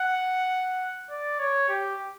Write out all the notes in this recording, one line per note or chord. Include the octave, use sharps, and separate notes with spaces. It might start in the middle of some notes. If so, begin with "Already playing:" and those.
Already playing: F#5
D5
C#5
G4